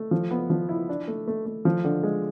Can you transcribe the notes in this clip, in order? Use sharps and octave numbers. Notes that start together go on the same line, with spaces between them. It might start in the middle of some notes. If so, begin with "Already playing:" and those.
Already playing: A3
F3
B3
F3
E4
D4
A3
A3
A3
F3
D3
G#3